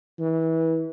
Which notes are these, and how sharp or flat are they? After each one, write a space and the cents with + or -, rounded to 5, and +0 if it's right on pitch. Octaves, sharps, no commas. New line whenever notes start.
E3 -25